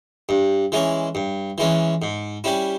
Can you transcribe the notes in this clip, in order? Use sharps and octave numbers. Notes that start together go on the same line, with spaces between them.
G2
E3 G#3 C#4
G2
E3 G#3 C#4
G#2
G3 C#4 E4